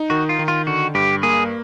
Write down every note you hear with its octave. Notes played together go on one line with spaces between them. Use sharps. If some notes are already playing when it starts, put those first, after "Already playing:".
Already playing: D#4
D#3 F#4
F4
D#3
F4
D3 F#4
G2 G4
A#3 G#4